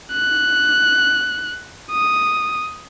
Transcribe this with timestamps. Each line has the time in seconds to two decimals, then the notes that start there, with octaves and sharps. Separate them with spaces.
0.13 F#6
1.92 D#6